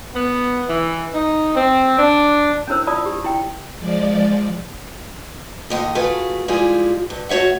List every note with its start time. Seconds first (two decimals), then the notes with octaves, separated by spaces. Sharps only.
0.14 B3
0.68 E3
1.14 D#4
1.55 C4
1.98 D4
2.67 C#4 D4 E4 A#4 C5 E6
2.87 F4 D5 A5 B5 D#6
3.06 G4
3.24 E4 G5
3.80 F3 G#3 D5
5.70 D#2 A2 D#5
5.95 A3 F4 F#4 G#4 B4
6.48 F3 G3 G#3 E4 F4 G#4
7.10 G2
7.29 A3 F#4 C#5 E5 F#5